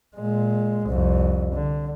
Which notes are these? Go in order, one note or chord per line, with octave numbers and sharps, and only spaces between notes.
A#2 G#3
C2 F2
D3